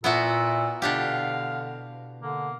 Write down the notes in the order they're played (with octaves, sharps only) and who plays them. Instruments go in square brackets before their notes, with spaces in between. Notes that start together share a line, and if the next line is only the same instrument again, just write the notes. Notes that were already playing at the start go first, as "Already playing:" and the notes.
[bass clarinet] A#2 [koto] B3 E4 F#4 [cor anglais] A4
[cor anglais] E5
[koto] B2 D4 G4 [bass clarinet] D3 [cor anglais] F5
[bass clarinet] D3 [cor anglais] A#3